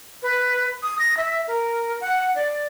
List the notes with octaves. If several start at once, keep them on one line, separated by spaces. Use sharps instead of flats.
B4
D#6
A#6
E5
A#4
F#5
D5